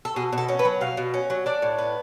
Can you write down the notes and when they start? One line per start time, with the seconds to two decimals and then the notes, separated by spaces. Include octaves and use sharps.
0.05 A4
0.16 B2 G#4
0.33 B2
0.38 A4
0.49 C#4
0.59 B4
0.65 F#3
0.81 B2 F5
0.97 B2
1.14 C#4
1.30 F#3
1.46 D4 D5
1.62 A2
1.78 B3